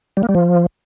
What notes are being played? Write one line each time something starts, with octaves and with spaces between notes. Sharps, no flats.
G3
A#3
G3
F3